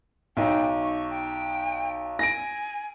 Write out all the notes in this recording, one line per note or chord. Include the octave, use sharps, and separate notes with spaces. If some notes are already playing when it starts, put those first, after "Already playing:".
B1 D#4 G5
C#6
G5
G#5 A#6 D7